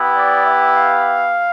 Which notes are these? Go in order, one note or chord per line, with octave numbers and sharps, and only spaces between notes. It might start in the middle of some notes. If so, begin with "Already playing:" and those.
Already playing: B3 E4 G4
D5
E5
F5